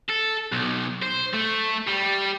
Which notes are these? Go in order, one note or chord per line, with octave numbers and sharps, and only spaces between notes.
A4
B1
C5
A3
G3